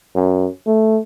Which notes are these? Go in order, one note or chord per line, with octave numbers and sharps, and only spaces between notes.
F#2
A3